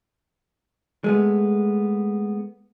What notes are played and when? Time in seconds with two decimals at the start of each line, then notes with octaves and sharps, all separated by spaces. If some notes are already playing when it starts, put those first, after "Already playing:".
1.04 G#3 A3 B3